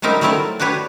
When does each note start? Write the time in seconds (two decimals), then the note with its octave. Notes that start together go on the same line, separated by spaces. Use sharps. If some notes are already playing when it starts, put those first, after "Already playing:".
0.02 F#3 G3 C4 D#4 A#4 E5
0.21 F#3 A3 C4 E4 A#4 A5
0.60 D4 F#4 G4 B4 C#5